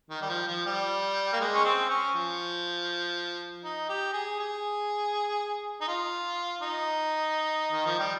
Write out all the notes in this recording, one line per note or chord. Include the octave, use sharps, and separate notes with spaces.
D#3
G3
F3
F3
G3
A#3
G#3
C#4
C4
C#4
F3
D#4
G4
G#4
G#4
D#4
F4
D#4
D#3
F3
G3